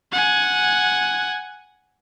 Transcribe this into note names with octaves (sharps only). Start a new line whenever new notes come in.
F#5 G#5